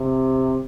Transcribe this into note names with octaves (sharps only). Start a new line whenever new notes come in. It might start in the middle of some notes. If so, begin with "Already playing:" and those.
Already playing: C3